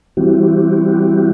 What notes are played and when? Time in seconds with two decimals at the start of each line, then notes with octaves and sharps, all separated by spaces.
0.17 E3 G3 C4 E4 F#4 G4